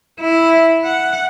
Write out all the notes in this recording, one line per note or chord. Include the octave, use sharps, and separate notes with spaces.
E4
F#5